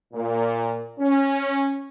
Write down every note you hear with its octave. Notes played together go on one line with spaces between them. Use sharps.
A#2
C#4